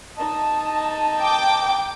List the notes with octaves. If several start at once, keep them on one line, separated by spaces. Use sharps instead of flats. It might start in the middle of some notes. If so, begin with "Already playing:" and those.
D#4 D#5 A5
G5 D6